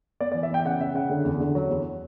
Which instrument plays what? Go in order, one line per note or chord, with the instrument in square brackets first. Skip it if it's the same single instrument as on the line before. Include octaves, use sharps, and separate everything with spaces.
[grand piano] B3 D5
D5
E3
E5
B3 G5
C#3 F#5
C#3 E5
C#3 F#5
D3
E2
D3
F#3
E2